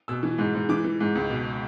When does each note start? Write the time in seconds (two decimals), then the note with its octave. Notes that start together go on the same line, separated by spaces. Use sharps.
0.08 B2 E6
0.23 E3
0.39 G#2
0.55 G#2
0.69 E3 D6
0.85 E3
1.00 G#2
1.15 C#2
1.30 B2